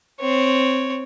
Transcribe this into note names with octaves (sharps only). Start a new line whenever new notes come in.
C4 C#5